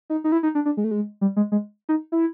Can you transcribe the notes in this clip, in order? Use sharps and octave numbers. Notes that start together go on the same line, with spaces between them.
D#4
D#4
E4
D#4
D4
D4
G#3
A3
G#3
G3
G#3
G#3
D#4
E4